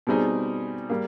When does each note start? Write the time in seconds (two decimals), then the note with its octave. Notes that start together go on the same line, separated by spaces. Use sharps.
0.07 B2 G3 C4 D#4 G#4
0.90 G3 A#3